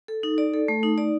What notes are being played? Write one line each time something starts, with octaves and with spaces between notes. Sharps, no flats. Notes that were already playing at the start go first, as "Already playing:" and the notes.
A4
D#4
D5
A4
A3
D#4
D5